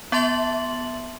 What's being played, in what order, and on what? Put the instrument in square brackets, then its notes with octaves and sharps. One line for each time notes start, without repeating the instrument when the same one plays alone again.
[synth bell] B3 E5 A5 C6 A6 F#7